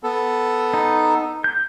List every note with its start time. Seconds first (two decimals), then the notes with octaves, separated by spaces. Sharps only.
0.03 B3 A4
0.74 D#4
1.44 G6